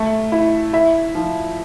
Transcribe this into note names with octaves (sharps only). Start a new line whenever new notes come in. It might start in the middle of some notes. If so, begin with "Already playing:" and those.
Already playing: A3
E4
E4 E5
F3